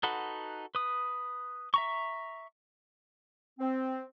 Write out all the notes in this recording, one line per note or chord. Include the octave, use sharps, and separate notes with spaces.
D#4 F#4 A4 B4 F#5
B4 D#6
E5 A#5 C#6
C4